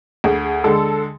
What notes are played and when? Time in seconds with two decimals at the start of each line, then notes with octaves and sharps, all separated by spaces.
0.24 D2 G#4
0.64 D3 G#3 A4